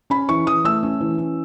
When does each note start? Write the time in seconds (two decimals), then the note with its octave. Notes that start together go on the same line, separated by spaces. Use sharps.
0.10 C#4 B5
0.29 E3 C#6
0.46 E3 D#6
0.64 A3 E6
0.83 C#4
1.01 E3
1.18 C#4